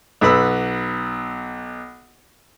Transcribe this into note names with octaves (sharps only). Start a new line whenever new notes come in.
B1 B3 B5 E6